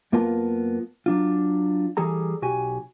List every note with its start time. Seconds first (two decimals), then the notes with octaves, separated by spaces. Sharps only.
0.12 F#2 A#3 B3 F4 A#4 A5
1.06 F#3 D4 F4
1.97 E3 G3 G#4 A4 A#5
2.42 B1 F#4 G4 G#5